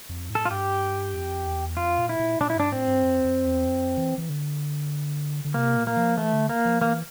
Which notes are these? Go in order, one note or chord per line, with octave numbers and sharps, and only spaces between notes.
F2
A2
A4
F4
G2 G4
F2
E2
F2 F4
A#2
E4
A#2
A#2 D4
E4
G2 D4
A2 C4
G2
F2
F2
E2
F2
E3
E3
D3
D3
C3 A#3
A#2
A#3
F3
E3 A3
D3
A#3
F3
E3 A#3